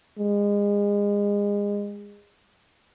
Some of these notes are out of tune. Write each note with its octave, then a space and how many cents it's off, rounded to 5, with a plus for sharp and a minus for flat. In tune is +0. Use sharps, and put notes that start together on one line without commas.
G#3 -30